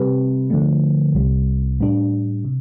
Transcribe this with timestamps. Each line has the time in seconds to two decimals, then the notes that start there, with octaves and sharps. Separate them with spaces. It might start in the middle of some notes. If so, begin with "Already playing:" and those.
Already playing: C3 G3 C4 G4 B4
0.50 D3 F3 A3
1.15 C2 C3 G3
1.80 A2 G3 D4
2.45 C3